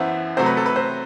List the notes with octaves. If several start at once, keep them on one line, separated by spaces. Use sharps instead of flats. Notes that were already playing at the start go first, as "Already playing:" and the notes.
Already playing: F#2 E3 B3 C5 E5
C3 F#3 A3 C5
B4
A4
B4
C5